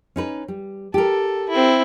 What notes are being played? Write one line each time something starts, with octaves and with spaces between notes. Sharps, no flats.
C#4 D#4 B4
G3
G4 A4 A#4
C4 E4